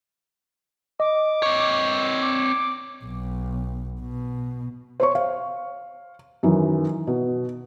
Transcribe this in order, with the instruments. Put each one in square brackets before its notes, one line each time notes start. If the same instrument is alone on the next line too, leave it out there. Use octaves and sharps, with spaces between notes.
[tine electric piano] D#5 [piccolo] D6
[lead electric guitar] C4 C#5
[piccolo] D6
[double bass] B1
B2
[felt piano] C5 C#5 C#6
F5
F#2 D#3 E3
B2